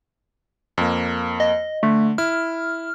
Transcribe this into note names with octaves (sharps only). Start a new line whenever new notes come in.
F2 A#3
D#5
D3 A3
E4 F6